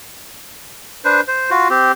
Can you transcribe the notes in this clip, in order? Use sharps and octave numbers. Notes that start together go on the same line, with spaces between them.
D4 B4 C5
C5
F4 F#4
C4 G4